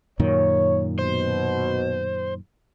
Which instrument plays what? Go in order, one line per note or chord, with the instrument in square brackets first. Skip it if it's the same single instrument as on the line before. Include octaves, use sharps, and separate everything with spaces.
[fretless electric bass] F#2 A#2 D#3 [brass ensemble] C#5
[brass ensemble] B2 [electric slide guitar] C5